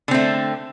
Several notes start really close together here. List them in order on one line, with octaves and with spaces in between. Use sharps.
D3 C4 A3